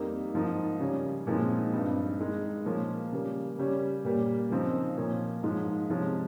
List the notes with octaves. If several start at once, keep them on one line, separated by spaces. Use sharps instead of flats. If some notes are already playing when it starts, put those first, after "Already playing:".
Already playing: F2 D#3 G3 A#3 D#4
G#2 F3 A#3 D#4
C#3 G3 C#4
A#2 F3 G#3 C4 D#4
G2 G3 C4 D#4
D#3 G#3 D#4
A#2 F3 A#3 C#4
C#3 G3 A#3
C#3 G3 C#4
A#2 G3 A#3
C#3 F3 C4 D#4
A#2 F3 A#3 C#4
G#2 F3 G#3 D#4
C3 F3 G#3 C#4